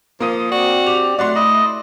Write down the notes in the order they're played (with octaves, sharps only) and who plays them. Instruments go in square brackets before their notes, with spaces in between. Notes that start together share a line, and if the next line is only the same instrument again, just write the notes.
[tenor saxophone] F3 [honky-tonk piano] A#3 D#6 D#7
[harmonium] C4 D5 [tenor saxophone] F#4
[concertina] G4 [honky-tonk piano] F7
[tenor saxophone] F#3 [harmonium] A3 [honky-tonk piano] D5 C6 [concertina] F#5
[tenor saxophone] E4 [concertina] D#5